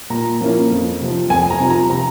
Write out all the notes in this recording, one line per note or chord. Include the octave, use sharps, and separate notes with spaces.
A#2 A#5
F3 A#3 C#4 E4
F2
C3 F3
F2 G#5
A#5
C3 F3
A#5
C3 A#5